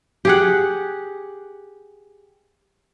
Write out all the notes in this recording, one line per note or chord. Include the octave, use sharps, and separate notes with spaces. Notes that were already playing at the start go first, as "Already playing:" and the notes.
G4 G#4 F#5